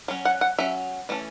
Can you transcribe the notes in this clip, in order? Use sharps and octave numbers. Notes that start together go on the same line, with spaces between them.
F#3 C#4
F#5
F#5
F#3 C#4 E5
E3 A3 C#4